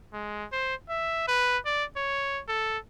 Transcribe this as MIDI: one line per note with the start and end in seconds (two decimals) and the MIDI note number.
0.13 0.45 56
0.52 0.75 72
0.89 1.27 76
1.28 1.58 71
1.66 1.84 74
1.96 2.41 73
2.48 2.78 69